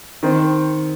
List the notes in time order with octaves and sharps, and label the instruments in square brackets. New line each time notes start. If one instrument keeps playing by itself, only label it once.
[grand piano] D#3 C4